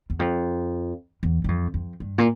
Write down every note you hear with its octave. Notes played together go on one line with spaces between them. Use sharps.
E2
F2
E2
G2
F2
F2
G2
A#2